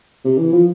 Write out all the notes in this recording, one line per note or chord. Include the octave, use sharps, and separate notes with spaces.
C3
E3
F3